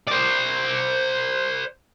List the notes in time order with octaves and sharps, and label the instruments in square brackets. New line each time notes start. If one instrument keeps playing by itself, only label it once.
[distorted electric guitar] C5 D5